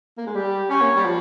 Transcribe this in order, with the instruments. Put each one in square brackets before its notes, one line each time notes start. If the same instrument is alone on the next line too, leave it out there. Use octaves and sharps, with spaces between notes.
[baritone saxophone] A#3
G#3
[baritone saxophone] G3 [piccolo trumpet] G4
[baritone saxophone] C#4 [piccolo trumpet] C#5
[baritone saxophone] A#3
G3
F3